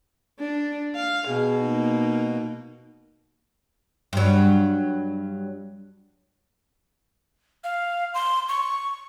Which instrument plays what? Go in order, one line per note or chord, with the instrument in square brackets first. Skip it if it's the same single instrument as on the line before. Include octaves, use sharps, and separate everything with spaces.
[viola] D4
F5
[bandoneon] B2 [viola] G#4
[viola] A#3 D#4
[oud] G2 F#3
[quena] F5
C6
C#6